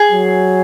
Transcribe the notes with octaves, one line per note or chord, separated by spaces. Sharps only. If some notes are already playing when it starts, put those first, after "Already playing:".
Already playing: G#4
F#3